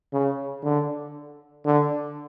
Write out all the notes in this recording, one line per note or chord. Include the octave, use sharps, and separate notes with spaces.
C#3
D3
D3